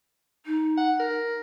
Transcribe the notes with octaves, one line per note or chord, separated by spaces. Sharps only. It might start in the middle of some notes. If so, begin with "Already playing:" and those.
D#4
F#5
A#4